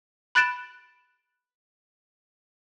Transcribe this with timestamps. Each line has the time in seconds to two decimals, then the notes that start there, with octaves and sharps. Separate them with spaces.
0.35 B5 F#6 A6 D7 E7